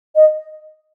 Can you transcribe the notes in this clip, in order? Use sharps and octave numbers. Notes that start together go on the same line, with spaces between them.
D#5